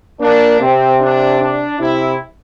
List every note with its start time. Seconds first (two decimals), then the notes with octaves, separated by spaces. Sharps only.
0.21 A#3 D4
0.60 C3 C4
1.00 D4
1.41 D4
1.79 C3 E4